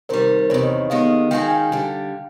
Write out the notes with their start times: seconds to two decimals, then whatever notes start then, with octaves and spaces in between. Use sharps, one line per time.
0.09 C3 D#3 G3 A#4 C5
0.39 C5
0.50 E2 C3 D#3 B4 C#5
0.63 C#5 D#5
0.90 D#2 D#3 G#3 B3 D#5 F5
1.31 D#3 G#3 C#4 F#4 F5 G5
1.41 G#5
1.51 F5 G5
1.72 D3 G3